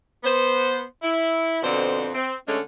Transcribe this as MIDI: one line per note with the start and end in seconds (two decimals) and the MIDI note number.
0.24 0.84 59
0.24 0.84 72
1.03 1.62 64
1.63 2.09 41
1.63 2.09 47
1.63 2.09 50
1.63 2.09 60
1.63 2.09 72
2.15 2.35 60
2.47 2.59 50
2.47 2.59 56
2.47 2.59 57
2.47 2.59 61